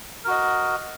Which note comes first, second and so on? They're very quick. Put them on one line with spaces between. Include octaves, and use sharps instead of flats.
A#4 F#4 D#5